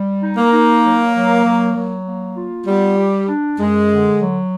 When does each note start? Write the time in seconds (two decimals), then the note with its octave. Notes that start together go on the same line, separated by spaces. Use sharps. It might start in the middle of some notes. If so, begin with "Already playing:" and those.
Already playing: G3
0.22 D#4
0.37 A#3
0.52 D#4
0.84 F#3
1.15 F#3
1.45 F#3
1.75 F#3
2.05 A#3
2.37 F4
2.67 G3 B3
2.98 G4
3.28 D4
3.59 F#2 G#3
3.90 D3
4.21 F#3